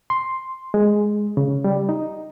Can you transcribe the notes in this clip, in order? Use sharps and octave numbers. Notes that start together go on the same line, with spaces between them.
C6
G#3
C#3
G3
D#4